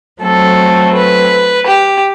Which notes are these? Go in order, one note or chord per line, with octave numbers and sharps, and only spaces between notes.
F#3 A3 C4 A4
B4
G4